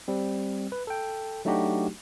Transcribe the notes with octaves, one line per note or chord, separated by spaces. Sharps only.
G3 C4
B4
A4 G5
F#3 A3 D4 D#4 F#4 G4